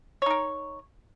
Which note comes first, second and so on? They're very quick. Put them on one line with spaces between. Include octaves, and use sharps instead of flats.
C#5 D#4 A#4